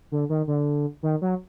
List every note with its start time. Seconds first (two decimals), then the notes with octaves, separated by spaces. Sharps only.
0.12 D3
0.29 D#3
0.47 D3
1.03 D#3
1.22 F#3